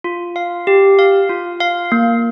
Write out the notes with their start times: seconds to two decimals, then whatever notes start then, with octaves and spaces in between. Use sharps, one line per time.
0.04 F4
0.36 F5
0.67 G4
0.99 F5
1.29 F4
1.60 F5
1.92 A#3